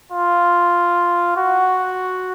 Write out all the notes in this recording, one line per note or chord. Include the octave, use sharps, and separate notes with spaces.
F4
F#4